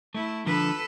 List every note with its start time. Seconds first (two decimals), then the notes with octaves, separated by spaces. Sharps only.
0.14 A3 E4
0.46 D3 F3 A4 B4